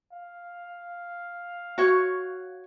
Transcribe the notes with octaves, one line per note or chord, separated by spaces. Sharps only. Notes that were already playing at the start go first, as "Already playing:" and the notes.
F5
F#4 C#5